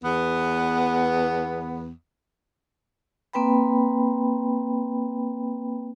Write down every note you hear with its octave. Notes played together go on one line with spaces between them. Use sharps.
E2 B3
A#3 C4 B4 G5 B5